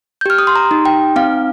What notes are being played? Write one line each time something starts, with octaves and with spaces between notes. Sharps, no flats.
G6
G4 F6
D#6
C6
A#5
D#4
G5
C4 F5